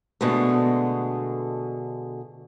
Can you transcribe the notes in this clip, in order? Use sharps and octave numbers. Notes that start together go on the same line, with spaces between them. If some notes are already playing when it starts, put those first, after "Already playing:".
B2 D3 G#3 A3